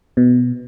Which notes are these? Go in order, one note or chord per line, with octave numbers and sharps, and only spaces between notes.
B2